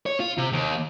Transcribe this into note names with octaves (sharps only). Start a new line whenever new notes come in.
C#5
F4
C3
D#2